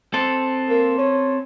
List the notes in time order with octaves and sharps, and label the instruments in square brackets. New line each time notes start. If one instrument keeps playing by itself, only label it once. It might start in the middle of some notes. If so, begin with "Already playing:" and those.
[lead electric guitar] C4 A4
[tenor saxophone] A#3
C#4